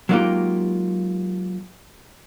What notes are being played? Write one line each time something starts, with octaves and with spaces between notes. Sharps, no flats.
F#3 G#3 A#3 D#4 F4 G4